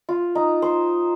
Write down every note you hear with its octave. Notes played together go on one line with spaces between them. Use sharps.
F4
D#4
C5